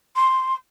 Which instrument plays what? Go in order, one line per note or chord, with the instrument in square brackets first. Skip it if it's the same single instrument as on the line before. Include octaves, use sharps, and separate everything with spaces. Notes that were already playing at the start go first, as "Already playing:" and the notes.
[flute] C6